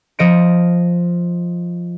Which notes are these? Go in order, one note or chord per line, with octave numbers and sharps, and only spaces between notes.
F3 D#5 C#7 D7